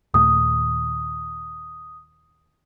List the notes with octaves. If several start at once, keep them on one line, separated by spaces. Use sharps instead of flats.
D#2 A#2 A3 D#6